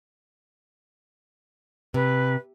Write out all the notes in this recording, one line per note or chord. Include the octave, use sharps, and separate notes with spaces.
C3 B4